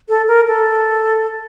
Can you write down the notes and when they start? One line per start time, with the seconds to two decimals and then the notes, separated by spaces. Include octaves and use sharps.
0.09 A4
0.28 A#4
0.47 A4